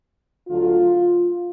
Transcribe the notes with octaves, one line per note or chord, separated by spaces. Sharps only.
D2 D3 F#3 A3 F4